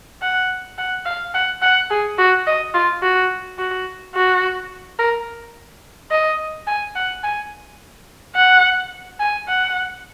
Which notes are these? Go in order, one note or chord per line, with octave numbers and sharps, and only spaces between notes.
F#5
F#5
F5
F#5
F#5
G#4
F#4
D#5
F4
F#4
F#4
F#4
A#4
D#5
G#5
F#5
G#5
F#5
G#5
F#5